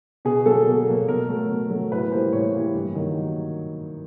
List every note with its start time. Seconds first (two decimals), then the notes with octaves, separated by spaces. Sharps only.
0.25 B2 G#4
0.46 F#3 A#3 A4
0.66 B2
0.87 F#3 A#3
1.08 B2 A#4
1.29 F#3 A3
1.49 B2
1.70 F#3 A3
1.91 A2 B4
2.12 E3 G3 A#3 C5
2.33 A2 C#5
2.53 E3 G3 A#3
2.74 G2
2.95 D#3 F#3 A#3